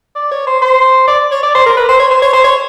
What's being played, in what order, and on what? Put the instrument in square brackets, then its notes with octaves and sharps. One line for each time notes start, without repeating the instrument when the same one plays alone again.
[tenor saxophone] D5
C#5
C5
C5
D5
C#5
D5
C5
A#4
B4
C5
C#5
C5
C#5
C5
C#5